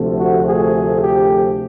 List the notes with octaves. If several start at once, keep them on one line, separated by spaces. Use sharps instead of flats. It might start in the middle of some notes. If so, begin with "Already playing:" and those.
Already playing: D2 C3 F3 A3
F#4
G#4
G4